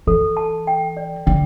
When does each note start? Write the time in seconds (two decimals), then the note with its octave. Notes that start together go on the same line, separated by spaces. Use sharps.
0.07 E3 A4
0.37 A5
0.67 G5
0.97 D5
1.26 D3 G5